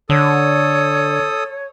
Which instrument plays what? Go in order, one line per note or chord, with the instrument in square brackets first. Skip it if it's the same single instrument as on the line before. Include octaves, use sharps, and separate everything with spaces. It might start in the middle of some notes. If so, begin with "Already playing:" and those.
[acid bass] D3 [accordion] A4 D#6 [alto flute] C#5